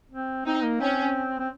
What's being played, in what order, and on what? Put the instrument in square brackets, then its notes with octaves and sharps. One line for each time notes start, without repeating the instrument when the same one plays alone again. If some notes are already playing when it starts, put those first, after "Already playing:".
[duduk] C4
[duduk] C4 [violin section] D#4
[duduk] A#3
[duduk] C4 [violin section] C#4
[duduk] C4